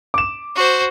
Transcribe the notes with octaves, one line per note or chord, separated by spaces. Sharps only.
D6 E7
F#4 C5